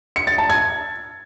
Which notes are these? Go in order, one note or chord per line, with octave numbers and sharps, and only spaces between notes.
C#7
A6
A5
G#6